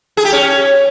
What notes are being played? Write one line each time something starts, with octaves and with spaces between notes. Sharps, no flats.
G#4
G4
C#4